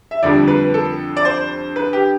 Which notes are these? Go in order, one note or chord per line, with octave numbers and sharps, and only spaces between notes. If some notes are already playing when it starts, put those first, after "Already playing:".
E5
F2 D3 G3 D5
B4
A4
D5
C5
B4
G4